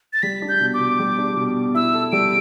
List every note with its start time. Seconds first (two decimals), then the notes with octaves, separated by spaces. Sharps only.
0.13 A6
0.23 G3 B6
0.42 D4
0.49 G6
0.61 B2
0.74 D6
0.80 B2
0.99 G3
1.18 D4
1.36 B2
1.56 B2
1.75 E4 E6
1.94 A4
2.12 G3 D7